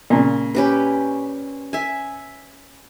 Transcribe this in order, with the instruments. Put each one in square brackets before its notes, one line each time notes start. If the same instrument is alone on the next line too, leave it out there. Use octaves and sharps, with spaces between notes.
[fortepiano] A#2 C#3
[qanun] C#4 G4 B4
E5 G#5